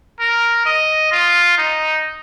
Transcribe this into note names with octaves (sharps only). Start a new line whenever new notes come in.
A#4
D#5
F4
D#4